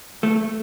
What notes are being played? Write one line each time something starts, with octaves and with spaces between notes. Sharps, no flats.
A3